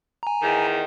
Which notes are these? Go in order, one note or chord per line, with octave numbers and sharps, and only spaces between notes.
G#5 A#5
E2 D#3